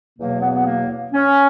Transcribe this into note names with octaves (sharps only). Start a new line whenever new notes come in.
E2 B2 F#3 A#3
B3
B3
A#3
C#4